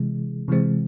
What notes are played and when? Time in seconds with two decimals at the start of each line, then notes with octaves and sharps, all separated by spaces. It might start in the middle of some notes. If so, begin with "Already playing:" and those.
Already playing: C3 E3 G#3
0.48 C3 E3 G#3 C4